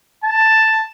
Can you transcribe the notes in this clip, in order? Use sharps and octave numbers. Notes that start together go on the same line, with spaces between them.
A5